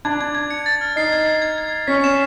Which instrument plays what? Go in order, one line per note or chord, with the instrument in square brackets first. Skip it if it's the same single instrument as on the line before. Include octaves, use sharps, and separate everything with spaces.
[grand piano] D4 [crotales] G#6
[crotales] G#6
G#6
C#7
A6
F6
[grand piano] D#4 [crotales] C7
[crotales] G#6
C7
G#6
G#6
G#6
[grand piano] C#4 [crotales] B6
[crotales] E7